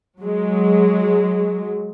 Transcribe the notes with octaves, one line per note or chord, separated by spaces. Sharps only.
F#3 G#3